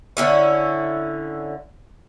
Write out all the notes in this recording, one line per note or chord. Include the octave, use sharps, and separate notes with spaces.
D3 C#4 E4